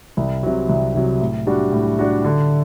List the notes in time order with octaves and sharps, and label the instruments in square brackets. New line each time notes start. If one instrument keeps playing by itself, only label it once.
[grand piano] C2
C3 F#3
C2
C3 F#3
A2
G3 D4 F#4
A2
G3 D4 F#4
D3